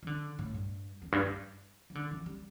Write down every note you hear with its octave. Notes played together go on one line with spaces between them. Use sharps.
E3
D3
A2
G2
E2
G2
G2
E3
D3
E3
G3